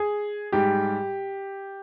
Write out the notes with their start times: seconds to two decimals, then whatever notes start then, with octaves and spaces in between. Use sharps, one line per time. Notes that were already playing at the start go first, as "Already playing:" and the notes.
Already playing: G#4
0.52 G#2 G3 G4